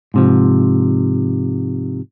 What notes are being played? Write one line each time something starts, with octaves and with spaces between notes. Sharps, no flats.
G#2 C3 F3